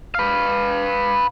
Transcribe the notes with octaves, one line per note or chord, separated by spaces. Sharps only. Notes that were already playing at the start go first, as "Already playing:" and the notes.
B4 F5